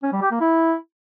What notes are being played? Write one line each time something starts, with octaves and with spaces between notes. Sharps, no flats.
C#4
G3
G4
A#3
E4